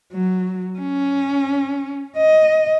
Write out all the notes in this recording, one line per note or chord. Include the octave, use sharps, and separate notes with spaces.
F#3
C#4
D#5